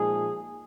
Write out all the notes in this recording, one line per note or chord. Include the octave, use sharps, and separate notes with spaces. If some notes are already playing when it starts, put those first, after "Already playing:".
Already playing: A#2 F3 G#3 D#4 G#4